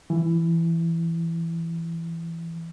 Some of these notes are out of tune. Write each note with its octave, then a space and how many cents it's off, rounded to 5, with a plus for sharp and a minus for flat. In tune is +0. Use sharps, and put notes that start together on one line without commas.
E3 +15